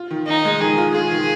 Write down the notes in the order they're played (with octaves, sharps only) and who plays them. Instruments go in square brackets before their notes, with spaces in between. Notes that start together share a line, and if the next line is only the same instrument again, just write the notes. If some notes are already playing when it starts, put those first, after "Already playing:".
Already playing: [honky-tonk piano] F4
D#3
[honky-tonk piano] D#3 [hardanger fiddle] D#4
[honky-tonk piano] G#3
[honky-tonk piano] D#3 [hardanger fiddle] G#4
[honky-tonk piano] F4
[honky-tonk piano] F4 [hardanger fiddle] G#4
[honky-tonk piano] D#3